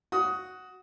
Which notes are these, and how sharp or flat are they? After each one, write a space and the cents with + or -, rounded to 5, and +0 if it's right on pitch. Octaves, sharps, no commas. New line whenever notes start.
F#4 +0 D#6 +15